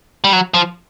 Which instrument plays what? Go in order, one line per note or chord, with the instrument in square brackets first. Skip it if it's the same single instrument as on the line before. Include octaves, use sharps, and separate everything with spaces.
[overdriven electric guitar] G3
F#3
F3